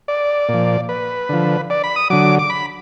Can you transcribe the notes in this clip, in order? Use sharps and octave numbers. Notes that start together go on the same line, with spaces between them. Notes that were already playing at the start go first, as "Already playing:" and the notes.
D5
A#2
F3
B4
D3 F3
D5
B5
D#6
D3 F#3 D6
D6
B5